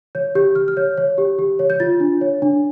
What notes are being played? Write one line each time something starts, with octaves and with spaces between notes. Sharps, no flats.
C#5 G6
G4 G6
G4 F6
F6
C#5 G6
C#5
G4
G4
C#5
G6
F4 A6
D4
C#5
D4